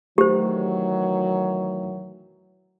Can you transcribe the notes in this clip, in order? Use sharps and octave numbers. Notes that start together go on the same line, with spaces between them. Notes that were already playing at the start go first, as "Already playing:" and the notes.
D#3 E3 F#3 A3 G4 C5